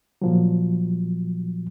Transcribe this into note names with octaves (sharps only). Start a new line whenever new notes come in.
A#2 F3 F#3